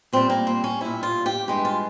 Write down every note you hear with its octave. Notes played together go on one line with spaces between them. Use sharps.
A#2 G3 C4
A#3
C4
C#4
A#2 G3 E4
F4
G4
G2 E3 G#3 G4
F4